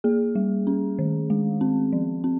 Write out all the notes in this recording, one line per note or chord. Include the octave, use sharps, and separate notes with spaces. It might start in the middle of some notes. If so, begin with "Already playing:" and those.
A#3 G#4
G3
C#4
D#3
G#3
C4
F3
C4